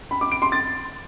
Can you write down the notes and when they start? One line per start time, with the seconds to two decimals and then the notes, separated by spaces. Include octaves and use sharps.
0.11 B5
0.21 D6
0.32 D7
0.42 C6
0.52 A6